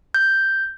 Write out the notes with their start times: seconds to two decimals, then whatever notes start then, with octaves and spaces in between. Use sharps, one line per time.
0.14 G6